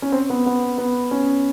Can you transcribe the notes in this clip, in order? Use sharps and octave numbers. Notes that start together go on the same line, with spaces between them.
C#4
C4
B3
B3
B3
C#4